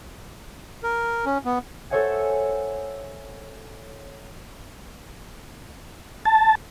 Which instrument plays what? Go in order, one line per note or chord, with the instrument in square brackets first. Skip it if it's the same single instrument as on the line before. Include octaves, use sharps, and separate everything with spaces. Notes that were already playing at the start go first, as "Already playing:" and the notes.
[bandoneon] A#4
C#4
B3
[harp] A4 C5 C#5 E5 F#5 G#5
[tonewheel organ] A5